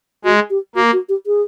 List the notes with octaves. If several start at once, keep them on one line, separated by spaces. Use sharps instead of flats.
G#3 F#4
G4
A#3 F#4
F#4
G4
G#4